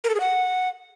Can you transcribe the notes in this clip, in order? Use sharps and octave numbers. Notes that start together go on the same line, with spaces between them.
A#4
A4
G#4
F#5